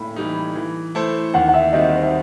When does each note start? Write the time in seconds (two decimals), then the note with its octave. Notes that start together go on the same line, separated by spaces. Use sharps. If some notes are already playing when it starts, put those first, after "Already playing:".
Already playing: A2 B5
0.16 E3 G3 D#4
0.55 E3
0.95 A3 E4 A4 C5
1.34 D#2 F#5
1.48 F#5
1.54 E5
1.73 D#3 G3 C4 F#4 D#5
1.93 C5
2.03 E5